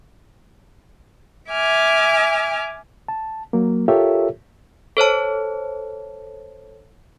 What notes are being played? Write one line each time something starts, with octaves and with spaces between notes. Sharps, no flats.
E5 G#5 D6 F6
A5
F#3 A#3
F4 G4 A4 A#4 C#5 E5
A4 C5 C#5 A5